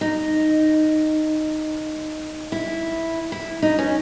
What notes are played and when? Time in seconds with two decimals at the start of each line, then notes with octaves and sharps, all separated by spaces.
0.01 D#4
2.52 E4
3.32 E4
3.62 D#4
3.79 C#4